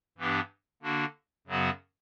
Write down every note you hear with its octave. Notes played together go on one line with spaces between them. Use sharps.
G2 E3 B3 D4 G4
D3 A#3 D4 F#4
F#2 C#3 F#3 B3 F#4